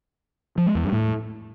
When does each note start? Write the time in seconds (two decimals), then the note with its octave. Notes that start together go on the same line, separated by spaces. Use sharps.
0.58 F3
0.66 G#3
0.75 E2
0.84 G2
0.92 A2